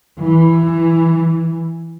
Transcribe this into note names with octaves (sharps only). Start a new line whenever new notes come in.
E3